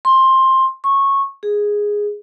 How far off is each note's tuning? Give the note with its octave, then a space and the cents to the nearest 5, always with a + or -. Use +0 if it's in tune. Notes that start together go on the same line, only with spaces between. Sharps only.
C6 +15
C#6 -15
G#4 -5